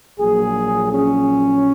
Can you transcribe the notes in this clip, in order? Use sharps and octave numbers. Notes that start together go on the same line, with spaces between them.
A#1 A#2 F#3 G#4
C#4